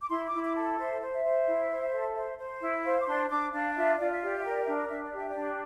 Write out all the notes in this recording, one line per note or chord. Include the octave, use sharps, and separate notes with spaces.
D6
E4 C6
D6
E4
D6
A4
C5 E5
C5
E5
C5
E4
C5
A4
C5
C5
E4
C5 F5
D6
D4 C6
D4 D6
D4 F5
F4 E5
F4 D5
E5
G4 D5
E5
A#4
D5
D4 E5
D5
D4 E5
D5
G4 E5
D5
D4